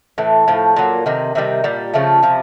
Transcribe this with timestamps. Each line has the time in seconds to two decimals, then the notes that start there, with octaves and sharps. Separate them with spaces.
0.18 A2 E3
0.48 A2 F3
0.76 A#2 F#3
1.06 C3 D#3
1.35 C3 D#3 G3
1.64 A#2 G3
1.93 C#3 F3 A3
2.22 C3 F3